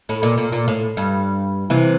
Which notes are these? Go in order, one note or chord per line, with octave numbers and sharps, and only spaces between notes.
A2
A#2
A#2
A#2
A2
G2
C3 E3